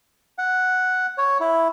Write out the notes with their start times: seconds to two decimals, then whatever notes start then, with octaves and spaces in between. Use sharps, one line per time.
0.38 F#5
1.18 C#5
1.41 E4